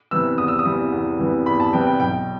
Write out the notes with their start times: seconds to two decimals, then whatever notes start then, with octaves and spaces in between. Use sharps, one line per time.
0.11 C3 E3 G3 B3 E6
0.38 E2 D#6
0.48 E6
0.59 D#6
0.65 C3 E3 G3 B3
0.92 E2
1.19 C3 E3 G3 B3
1.46 E2 B5
1.60 A5
1.73 C3 E3 G3 B3 G5
1.87 G5
2.00 B1 G5